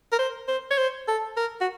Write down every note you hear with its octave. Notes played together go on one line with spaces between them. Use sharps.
A#4
C5
C5
C#5
C5
A4
A#4
F#4